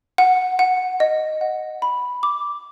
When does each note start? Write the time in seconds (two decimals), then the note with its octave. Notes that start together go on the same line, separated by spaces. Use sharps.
0.18 F#5
0.59 F#5
1.00 D#5
1.41 F#5
1.82 B5
2.23 D6